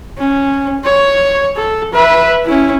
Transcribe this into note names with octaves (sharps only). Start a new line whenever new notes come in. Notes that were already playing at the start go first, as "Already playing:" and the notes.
C#4
C#5
A4
B4 E5
C#4 E4